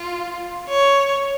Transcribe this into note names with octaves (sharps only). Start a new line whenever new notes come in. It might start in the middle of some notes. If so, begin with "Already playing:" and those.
Already playing: F4
C#5